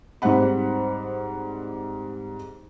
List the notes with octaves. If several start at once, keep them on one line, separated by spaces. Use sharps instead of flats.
G#2 G3 C4 C5 F#5 B5